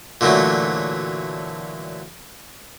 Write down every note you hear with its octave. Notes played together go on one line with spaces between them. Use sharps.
A#2 D3 E3 F#3 A3